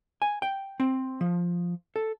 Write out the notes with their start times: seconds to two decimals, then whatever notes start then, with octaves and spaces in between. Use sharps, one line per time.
0.22 G#5
0.42 G5
0.80 C4
1.21 F3
1.96 A4